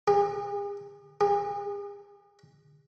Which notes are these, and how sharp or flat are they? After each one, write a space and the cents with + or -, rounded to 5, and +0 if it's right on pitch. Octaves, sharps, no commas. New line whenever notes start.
G#4 -45
G#4 -40